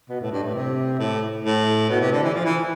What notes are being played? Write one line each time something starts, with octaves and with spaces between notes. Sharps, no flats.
B2
A2
G2
A2
C3
A2
A2
B2
C3
D3
E3
F3
E3